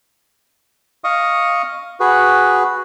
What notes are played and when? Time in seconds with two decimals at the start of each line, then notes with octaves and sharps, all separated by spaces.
1.04 D#5 F5 C#6 D#6
2.00 F#4 G#4 B4